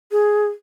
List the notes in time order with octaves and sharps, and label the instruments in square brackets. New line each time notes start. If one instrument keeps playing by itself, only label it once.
[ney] G#4